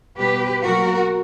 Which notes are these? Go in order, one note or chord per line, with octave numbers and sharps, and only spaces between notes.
B2 G3 B3 G4 B4
B2 F#3 A#3 F#4 A#4